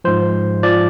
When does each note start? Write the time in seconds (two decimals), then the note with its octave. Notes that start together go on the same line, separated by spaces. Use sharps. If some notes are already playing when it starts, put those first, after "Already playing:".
0.04 G#2 F3 C5
0.63 F3 D5